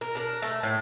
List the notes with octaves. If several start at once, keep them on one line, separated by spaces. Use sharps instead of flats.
A#4
D4 A#4
A3
A2